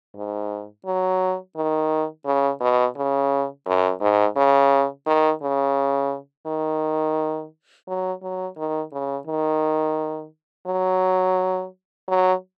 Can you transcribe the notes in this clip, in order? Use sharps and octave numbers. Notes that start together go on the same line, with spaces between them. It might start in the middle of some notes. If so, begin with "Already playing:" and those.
G#2
F#3
D#3
C#3
B2
C#3
F#2
G#2
C#3
D#3
C#3
D#3
F#3
F#3
D#3
C#3
D#3
F#3
F#3